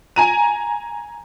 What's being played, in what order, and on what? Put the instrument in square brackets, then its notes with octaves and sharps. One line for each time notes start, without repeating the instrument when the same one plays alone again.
[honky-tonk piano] G#5 A#5 D#7